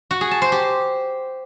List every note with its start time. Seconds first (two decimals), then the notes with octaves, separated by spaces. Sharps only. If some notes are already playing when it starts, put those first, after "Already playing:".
0.11 F#4
0.21 G#4
0.31 A5
0.42 C5
0.52 G4